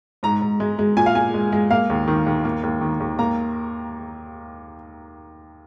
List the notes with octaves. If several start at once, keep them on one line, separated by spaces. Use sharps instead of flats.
G#2 A#5
G#2
G#3
G#3
A#2 G#5
F5
A#2 G#5
G#3
G#3
A#3 F5
D#2
D#3
D#2
A#3
D#2
D#3
D#2
A#3 A#5